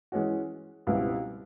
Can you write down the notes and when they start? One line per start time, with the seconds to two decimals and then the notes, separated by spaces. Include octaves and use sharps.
0.12 E3 G#3 C#4 F#4
0.87 C#2 B2 G3 C4 E4